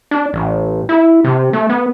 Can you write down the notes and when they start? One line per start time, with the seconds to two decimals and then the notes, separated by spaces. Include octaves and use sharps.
0.11 D4
0.33 A1
0.89 E4
1.24 C3
1.53 A3
1.69 B3